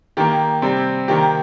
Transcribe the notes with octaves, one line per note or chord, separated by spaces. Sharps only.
D#3 A#3 G4
C3 G3 C4
C3 D#3 A#3 G4